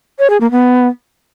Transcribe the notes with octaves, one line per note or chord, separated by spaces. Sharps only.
C#5
G#4
A#3
B3